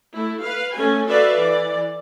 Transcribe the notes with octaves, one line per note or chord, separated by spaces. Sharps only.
A3 E4
B4 F5
A3 C#4 G#5
F#4 A4 B4 D5 E5 F5
E3 D5